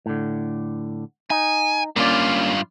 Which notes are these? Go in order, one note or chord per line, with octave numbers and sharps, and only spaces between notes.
A2 D3
D#4 G#5
G2 A#3 C#4 F4 D5